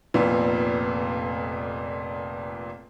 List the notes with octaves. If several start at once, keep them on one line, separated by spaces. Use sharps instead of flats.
F1 F2 A#2 B3